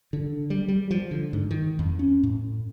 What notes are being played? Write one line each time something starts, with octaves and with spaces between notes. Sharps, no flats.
D3
G3
G3
F3
D3
G#2
D#3
F2
C#4
A2